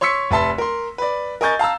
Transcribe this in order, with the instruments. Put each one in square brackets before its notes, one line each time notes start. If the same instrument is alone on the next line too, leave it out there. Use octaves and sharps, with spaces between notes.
[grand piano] C#5 C6 C#6 E6 B6 C#7
F1 B4 E5 A5 C6 B6
A#4 C6
B4 D5
A#4 D#5 G#5 C#6 G6 A6
F5 A5 A#5 E6